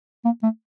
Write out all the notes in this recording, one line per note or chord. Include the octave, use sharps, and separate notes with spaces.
A#3
A3